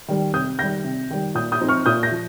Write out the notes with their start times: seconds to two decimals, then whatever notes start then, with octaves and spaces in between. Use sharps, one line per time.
0.08 D#3 G3
0.34 C3 D#6 G6
0.59 D#3 G3 G6 A#6
0.84 C3
1.10 D#3 G3
1.35 A#2 D#6 G6
1.52 D#6 G6
1.60 F3 C4 D#4
1.69 C#6 F6
1.86 A#2 D#6 G6
2.03 G6 A#6
2.11 F3